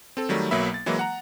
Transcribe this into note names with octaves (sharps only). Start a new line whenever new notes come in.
C4 A4
D#3 F#3 G3 A3
B1 F#3 A#3 B3 E5 B5
A6
E3 F#3 G#3 A#3 E4
F#5 A#5